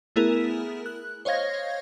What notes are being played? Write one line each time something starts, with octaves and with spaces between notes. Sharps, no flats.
A3 B3 E4 G#4 A#4
F#6
C5 C#5 D#5 F5 G#6 A#6